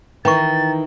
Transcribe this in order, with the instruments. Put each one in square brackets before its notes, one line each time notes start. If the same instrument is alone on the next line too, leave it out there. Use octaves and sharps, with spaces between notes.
[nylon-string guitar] D#3 E3 [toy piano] B4 C#6 [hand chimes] G5 A#5 [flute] A6